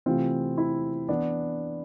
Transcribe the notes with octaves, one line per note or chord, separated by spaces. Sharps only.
C3 E3 A3 C4 F4
E4
E3 B3 D4